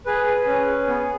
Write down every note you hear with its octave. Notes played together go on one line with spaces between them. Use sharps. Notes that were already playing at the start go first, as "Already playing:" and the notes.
G#4 B4
G#4
C#4
G#4
B3